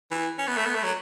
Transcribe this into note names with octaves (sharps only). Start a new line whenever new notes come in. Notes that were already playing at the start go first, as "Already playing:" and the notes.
E3
C#4
B3
A3
B3
A3
F#3